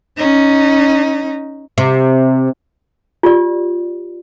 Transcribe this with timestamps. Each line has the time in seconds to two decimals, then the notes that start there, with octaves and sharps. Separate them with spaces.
0.17 C#4 D#4
1.78 C3
3.23 F4 G4 D5